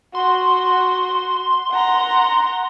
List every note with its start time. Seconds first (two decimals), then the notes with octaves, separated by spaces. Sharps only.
0.15 F#4 C6
1.71 F#5 A#5